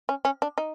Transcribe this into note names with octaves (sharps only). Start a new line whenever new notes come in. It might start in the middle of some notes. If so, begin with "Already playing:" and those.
C#4
C#4
D4
D#4